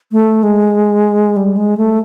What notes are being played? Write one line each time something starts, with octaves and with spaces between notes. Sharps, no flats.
A3
G#3
G3
G#3
A3